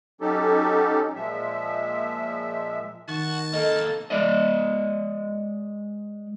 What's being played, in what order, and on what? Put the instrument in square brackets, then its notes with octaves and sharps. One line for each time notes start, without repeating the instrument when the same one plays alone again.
[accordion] F#3 C#4 D#4 G4 A4
A#2 F3 G#3 E5
[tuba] D#3 [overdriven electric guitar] F#4 [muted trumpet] A5
[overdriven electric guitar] A#3 C4 [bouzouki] D#4 A4
[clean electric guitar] G#3 D5 D#5